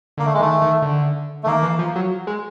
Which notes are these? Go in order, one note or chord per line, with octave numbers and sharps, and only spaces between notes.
D3 A#3
A3
G#3
D#3 A3
D#3
D3
A3
D#3 A#3
E3
F3
F#3
G#3